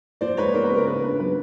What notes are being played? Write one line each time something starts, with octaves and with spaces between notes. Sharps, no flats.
F3 C5 D5
G#3 B4 C#5
B3 A#4 C5
B4
C#3
A#4
B3 B4
D4 B4
F#3 B4